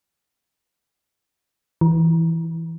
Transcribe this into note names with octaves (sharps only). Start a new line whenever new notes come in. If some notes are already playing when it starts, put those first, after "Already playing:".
E3